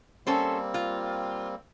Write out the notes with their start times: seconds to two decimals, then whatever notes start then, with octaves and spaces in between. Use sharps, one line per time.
0.27 G3 A#3 C4 C#4 A4 C5
0.74 F4